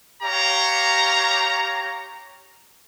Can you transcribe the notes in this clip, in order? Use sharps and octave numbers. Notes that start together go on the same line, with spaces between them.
G4 C#5 F5 A#5